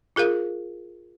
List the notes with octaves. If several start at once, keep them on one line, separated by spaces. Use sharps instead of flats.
F4 G#4 A#4 F5